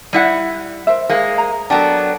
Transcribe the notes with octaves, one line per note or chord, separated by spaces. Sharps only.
G3 E4 F#5
A#4 C5 E5
G#3 A#3
A#5
F#3 B3 D4 A4 A#4 G5